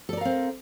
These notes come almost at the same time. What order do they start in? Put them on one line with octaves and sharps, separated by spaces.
A4 D5 A#4 F5 C4